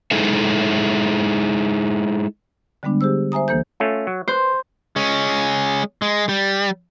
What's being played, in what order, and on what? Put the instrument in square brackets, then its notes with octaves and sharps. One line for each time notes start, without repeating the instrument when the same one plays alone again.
[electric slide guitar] G#3 D#4 E4 G#4 A4 E5
[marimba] D3 G3 G#3 B3 D4
G4 G#4 C5 E6
C5 E5 G#5 A#5 D#6
D2 E3 A#3 A4 C5 G6
[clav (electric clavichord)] A3 C#4 F4
F#3
[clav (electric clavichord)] B4 [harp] C5
[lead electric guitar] G#3 C#4
G#3
G3